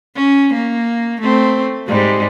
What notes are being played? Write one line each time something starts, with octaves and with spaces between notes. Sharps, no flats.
C#4
A#3
A3 C4
G#2 G3